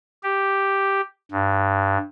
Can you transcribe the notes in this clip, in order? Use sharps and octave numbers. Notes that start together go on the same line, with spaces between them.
G4
G2